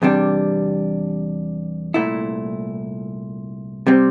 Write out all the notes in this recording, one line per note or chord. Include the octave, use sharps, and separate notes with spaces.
E2 C3 G3 D4
C2 A#2 A3 E4
C3 G3 C4